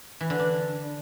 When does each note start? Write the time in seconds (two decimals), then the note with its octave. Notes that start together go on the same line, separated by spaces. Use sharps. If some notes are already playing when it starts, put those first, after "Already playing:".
0.21 E3
0.30 D3
0.39 D4